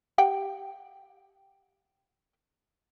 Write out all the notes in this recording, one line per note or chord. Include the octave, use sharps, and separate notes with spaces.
G4 F#5 G5